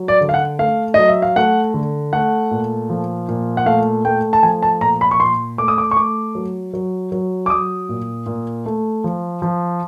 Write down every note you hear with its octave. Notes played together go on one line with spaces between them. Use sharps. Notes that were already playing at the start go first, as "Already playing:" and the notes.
Already playing: F#3
D5
D3
F5
F#5
A3 F5
F#3 D#5
E5
F5
A3 F#5
D3
A3 F#5
A#2
F3
A#2
F#5
A3 F5
A3 G5
A5
F3 G#5
A5
A#2 A#5
B5
C#6
A#2 C6
A3 D6
D#6
D6
C#6
A3 D6
F#3
F#3
F#3
D6
F#3 D#6
A#2
A#2
A3
F3
F3